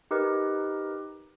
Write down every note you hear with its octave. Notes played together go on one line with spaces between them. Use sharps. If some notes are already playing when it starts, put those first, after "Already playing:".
D#4 G4 A#4 B4 D#5